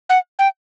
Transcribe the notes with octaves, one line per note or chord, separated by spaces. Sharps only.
F#5
G5